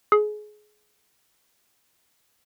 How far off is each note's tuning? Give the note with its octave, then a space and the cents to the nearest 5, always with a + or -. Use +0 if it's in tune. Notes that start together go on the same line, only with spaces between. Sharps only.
G#4 +25